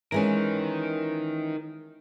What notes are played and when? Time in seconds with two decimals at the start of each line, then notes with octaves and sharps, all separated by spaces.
0.12 E3 G#3 C#4 D#4 A#4